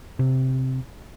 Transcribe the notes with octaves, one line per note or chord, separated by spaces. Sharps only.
C3